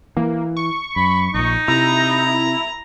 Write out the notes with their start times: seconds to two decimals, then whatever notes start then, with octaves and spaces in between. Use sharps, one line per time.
0.17 E3 A#3
0.57 C#6
0.96 F#2 B5
1.34 A#1 A#2 D#4
1.68 C3 E4 A#5